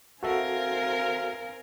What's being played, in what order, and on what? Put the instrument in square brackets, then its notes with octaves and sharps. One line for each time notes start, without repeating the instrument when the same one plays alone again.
[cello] C4 A#4 [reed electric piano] F#4 A4 E5 [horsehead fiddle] F5 G#5